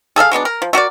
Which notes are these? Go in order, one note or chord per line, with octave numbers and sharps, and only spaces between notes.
G#4 A4 E5 F5
F#3 G#3 B3 D4
A#4
F3
A3 F#4 A#4 D5